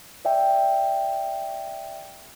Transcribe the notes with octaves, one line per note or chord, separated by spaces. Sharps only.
D5 E5 G5